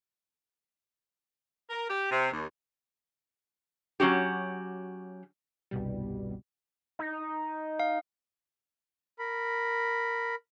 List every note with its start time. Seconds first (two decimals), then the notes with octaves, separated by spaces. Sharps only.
1.69 A#4
1.89 G4
2.11 C3
2.32 D#2
4.00 F#3 C#4 F#4 G4
5.71 G1 C2 B2 G3
6.99 D#4
7.80 F5
9.19 A#4 B5